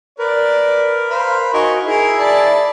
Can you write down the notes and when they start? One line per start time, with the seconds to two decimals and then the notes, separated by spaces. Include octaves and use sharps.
0.19 A#4 B4 D5
1.10 C5 F5 B5
1.54 D#4 F#4 A#4 D#5 G#5 C#6
1.86 E4 G#4 A#4 E5
2.19 D5 A5 B5